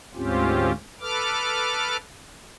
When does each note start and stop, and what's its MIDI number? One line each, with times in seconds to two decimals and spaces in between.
0.15 0.72 38
0.15 0.72 44
0.15 0.72 60
0.15 0.72 61
0.15 0.72 65
0.15 0.72 67
1.01 1.97 69
1.01 1.97 71
1.01 1.97 86
1.01 1.97 89